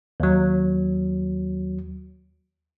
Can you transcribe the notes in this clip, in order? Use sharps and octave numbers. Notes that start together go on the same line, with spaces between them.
D#2 F#3